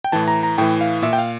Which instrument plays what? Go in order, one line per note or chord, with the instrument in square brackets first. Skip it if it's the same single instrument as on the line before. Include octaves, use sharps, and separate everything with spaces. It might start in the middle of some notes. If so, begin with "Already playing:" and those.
[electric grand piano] G5
A2 E3 A5
A#5
A#5
A2 E3 G5
F5
A#2 E5
G5
F5